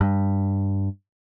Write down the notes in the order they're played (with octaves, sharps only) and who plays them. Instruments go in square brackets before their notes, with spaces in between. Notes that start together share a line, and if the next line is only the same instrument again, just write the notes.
[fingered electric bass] G2